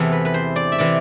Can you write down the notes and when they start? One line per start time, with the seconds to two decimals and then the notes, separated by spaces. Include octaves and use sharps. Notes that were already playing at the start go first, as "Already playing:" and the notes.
Already playing: E2 C3 E3 A4
0.12 B4
0.25 B4
0.34 C5
0.56 D5
0.72 E5
0.78 C3 E3 D5